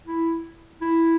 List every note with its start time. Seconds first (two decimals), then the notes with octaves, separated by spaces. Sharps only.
0.06 E4
0.82 E4